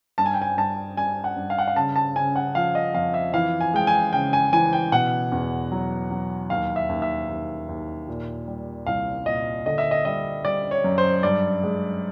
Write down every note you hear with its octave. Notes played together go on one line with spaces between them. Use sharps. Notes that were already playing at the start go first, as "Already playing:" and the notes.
G2 A5
G#5
G5
G#5
G2 A5
G3 G#5
F#5
G2
F5
F#5
F5
C#3 A5
A5
C#3 G#5
F#5
F3 F5
D#5
F2 F5
E5
E3 F5
G#5
G#3 G5
G#5
C#3 G5
G#5
E3 G#5
G5
B2 F#5
E2
F#3
F#3
D#2 F5
E5
D#2
E5
D#2
D#2
A#2
G3
C2 F5
A#2 D#5
D3 D#5
E5
D#5
G3 D#5
G3 D5
C#5
F#2
C5
G2 D5
G#3